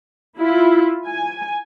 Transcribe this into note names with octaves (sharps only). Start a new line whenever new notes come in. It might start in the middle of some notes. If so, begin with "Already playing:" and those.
E4 F4
G#5